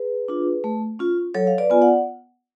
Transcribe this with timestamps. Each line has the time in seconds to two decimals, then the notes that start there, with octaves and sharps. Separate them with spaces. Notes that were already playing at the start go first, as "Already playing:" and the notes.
Already playing: G#4 B4
0.28 D4 F4
0.64 A3
0.99 C#4 F4
1.34 F#3 A4 C#5
1.47 F5
1.58 B4 D5
1.70 B3 F4 G#5
1.81 D5 F#5